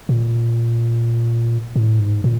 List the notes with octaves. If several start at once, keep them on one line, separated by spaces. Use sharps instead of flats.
A#2
A2
G#2
A#2